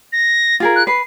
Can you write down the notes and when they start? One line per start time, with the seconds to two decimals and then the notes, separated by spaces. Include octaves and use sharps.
0.12 A#6
0.60 F4 G#4 A#4
0.76 F#6
0.87 B4 C7